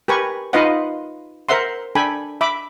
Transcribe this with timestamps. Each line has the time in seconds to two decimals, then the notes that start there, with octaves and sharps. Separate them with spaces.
0.08 G4 A#4 B4 G#5 C#6
0.53 D#4 F4 B4 D#5 F5 F#5
1.49 A#4 C5 E5 F#5 C6
1.95 D4 A4 G5 G#5 B5
2.41 E5 B5 D6